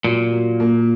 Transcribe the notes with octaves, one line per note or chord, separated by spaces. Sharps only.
A#2 F#3
F#3
A#3